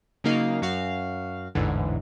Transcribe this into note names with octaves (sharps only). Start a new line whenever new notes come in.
C#3 F#3 A#3 D#4 F5
F#2 F#4 F5
A1 E2 G#2 D3 E3